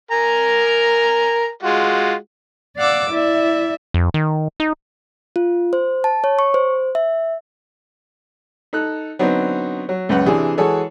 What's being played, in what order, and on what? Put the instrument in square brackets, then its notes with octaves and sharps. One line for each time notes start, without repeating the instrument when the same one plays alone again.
[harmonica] A#4 G#5 A#5
G#3 F4 F#4
[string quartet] D5 F5 F#5 D6 E6
E4 D5 E5
[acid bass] F2
D#3
D#4
[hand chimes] F4
C5
A5
C#5
C#6
C5
E5
[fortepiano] D#4 A4 F#6
D3 F#3 B3 C4 D4 D#4
F#3
C#2 F#2 B4 F#5
C3 E3 D4 G#4
E3 G#3 F#4 G#4 A4 C#5